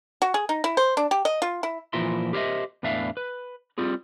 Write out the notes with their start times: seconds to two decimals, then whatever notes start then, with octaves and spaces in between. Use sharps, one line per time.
0.22 F#4
0.34 G#4
0.49 D#4
0.64 E4
0.77 C5
0.97 D4
1.11 G4
1.25 D#5
1.42 F4
1.63 E4
1.93 A#2 E3 F3 A#4 E5 C6
2.33 G4 A#4 C5 C#5 D#5 E5
2.83 E2 A2 E3 D4 E5 F5
3.17 B4
3.78 G3 C4 F4 G#4